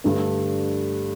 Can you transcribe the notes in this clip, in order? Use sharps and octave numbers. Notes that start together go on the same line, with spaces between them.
G2 D3 A3 D4